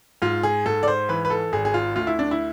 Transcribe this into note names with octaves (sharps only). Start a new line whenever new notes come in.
G#2 F4
G#4
G#2 A4
D5
C5
E3 B4
B4
A4
G#1 G#4
G#4
F4
D2 F4
E4
D4
E4